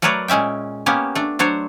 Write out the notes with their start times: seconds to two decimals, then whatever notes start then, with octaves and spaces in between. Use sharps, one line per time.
0.02 F#3 A3 A#4 B4 C#5 D5
0.28 A#2 G#3 C#4 E5 G5
0.86 A#3 B3 C#4 G4
1.15 A3 D4
1.39 F#3 D4 C5 C#5